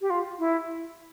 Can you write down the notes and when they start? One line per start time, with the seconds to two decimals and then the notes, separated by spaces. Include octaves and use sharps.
0.01 G4
0.10 F4
0.39 E4